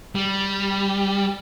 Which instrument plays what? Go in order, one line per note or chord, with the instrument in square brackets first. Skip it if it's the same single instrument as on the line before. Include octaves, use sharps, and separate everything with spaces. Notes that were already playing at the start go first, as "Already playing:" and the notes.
[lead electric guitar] G3